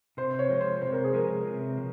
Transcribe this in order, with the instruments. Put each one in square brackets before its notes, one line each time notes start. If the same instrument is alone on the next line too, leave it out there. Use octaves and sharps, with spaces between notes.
[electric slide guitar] C3 [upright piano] C5
[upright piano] C#5
[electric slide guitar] F3 G#3
[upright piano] C5
[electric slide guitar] C3 [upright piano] C5
[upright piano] A#4
G#4
[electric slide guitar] F3 G#3 [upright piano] A#4
[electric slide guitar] C3
F3